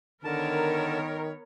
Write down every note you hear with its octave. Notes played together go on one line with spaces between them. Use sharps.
D3 D#3 B3 A#4 C#5 A5